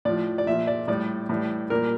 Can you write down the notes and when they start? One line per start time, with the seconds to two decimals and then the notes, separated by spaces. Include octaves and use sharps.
0.05 A2 F3 D5
0.38 D5
0.47 A#2 F3 E5
0.67 D5
0.88 A2 G3 D5
1.29 A2 E3 G3
1.70 A#2 G3 A#4